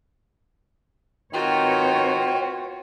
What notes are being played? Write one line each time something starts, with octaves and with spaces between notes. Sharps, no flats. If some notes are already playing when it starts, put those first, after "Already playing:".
D#3 C4 F4 F#4 B4 C#5 G5